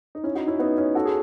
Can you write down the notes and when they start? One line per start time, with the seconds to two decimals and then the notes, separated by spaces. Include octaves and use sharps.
0.15 D#4
0.24 C#4 E4
0.35 D#4 F#4
0.47 C#4 E4
0.59 B3 D#4
0.78 C#4
0.95 F#4 A4
1.05 G#4